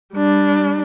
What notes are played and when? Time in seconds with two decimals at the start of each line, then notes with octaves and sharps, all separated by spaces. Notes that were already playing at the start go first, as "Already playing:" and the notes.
0.14 G3 D4